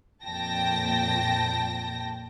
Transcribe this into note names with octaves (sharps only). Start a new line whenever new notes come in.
F2 A#2 G5 A5 A#6